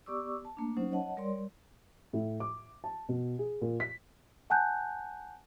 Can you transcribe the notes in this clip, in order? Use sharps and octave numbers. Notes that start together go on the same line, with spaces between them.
B3 G4 D5 C#6 D6 E6
A5
A3 A#3 D4
F#3 C#4 D#4 C5
C#5 D#5 F#5 A5
G3 A#4 C#5 D5 C6
A2
D6
A5
B2
G#4
A#2
B6
F#5 G#5 A5 F#6 G6